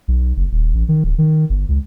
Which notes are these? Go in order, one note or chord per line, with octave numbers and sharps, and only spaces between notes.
B1
F#1
D#1
A1
D#3
D1
D#3
G1
C#2